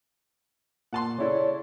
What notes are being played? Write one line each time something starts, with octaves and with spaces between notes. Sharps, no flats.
A#2 F#5 A5 C6
C#3 E4 A4 C#5 D5